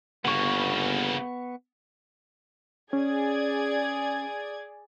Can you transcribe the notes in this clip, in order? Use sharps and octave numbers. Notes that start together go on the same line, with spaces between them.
G1 C#3 A#3 B3 C#6
C#4 G#4 D5 G#6